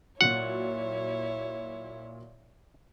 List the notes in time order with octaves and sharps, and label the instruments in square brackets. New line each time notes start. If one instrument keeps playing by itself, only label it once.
[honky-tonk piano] A#2 F#3 F#4 [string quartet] E4 C#5 [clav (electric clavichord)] F#5